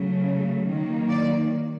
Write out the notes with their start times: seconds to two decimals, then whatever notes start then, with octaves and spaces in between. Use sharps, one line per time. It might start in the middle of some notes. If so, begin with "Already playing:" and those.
Already playing: C#3 F#3 A3
0.68 D#3 F#3 A#3
1.09 D5